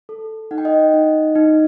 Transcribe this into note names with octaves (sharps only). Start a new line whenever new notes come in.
A4
D#4 F#5
G5
D#5 F#5
D#4
D#4